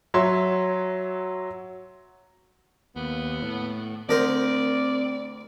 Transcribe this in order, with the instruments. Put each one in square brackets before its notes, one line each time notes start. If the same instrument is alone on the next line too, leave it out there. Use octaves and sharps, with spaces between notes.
[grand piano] F#3 C#5 E5 C6
[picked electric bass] D#2 [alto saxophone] B3
[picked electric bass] A2
[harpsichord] D2 A#4 C5 [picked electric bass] C4 [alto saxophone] D5